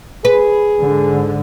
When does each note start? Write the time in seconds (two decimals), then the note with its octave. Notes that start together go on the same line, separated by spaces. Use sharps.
0.25 G#4 B4
0.80 G#2 D3